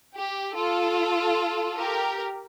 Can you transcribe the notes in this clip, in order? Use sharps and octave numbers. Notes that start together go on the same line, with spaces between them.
G4
F4 A4
G4 A#4